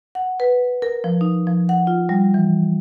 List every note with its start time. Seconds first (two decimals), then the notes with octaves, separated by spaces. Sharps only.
0.15 F#5
0.40 B4
0.82 A#4
1.04 F3
1.21 D#4
1.47 F3
1.69 F#5
1.87 F4
2.09 G3
2.34 E3